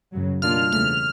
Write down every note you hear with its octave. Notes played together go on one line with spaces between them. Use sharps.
F#2 C#3 F#3
B2 G3 A#3 D4 F4 F6
E2 C#3 E3 A3 F6